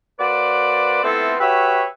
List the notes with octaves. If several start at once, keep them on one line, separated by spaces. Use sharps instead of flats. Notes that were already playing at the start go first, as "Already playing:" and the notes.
A#3 F#4 B4 C5 D5
A3 B3 C4 E4 F4 A4
F#4 G4 B4 C#5 E5